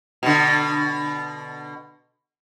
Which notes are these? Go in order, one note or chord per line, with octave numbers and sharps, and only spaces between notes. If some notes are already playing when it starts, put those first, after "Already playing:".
B2 D3